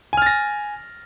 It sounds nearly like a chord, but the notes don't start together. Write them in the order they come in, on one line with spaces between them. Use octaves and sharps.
G#5 F6 A6 A#6